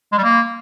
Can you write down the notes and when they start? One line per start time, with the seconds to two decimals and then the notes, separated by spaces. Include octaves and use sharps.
0.12 G#3
0.18 G3
0.24 A#3